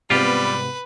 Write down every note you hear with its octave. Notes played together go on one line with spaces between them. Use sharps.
G#2 C3 G3 B3 F4 G4 B4